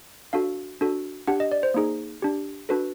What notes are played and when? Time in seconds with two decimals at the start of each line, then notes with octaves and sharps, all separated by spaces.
0.33 D4 F#4 A4 F5
0.81 D4 F#4 A4
1.27 D4 G4 F#5
1.40 D#5
1.52 D5
1.63 C5
1.74 A#3 D#4 G#4
2.22 D4 G4
2.69 D4 F#4 A4 B4